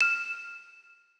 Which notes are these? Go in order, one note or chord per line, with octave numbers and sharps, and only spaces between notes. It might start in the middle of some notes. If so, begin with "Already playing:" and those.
F6 E7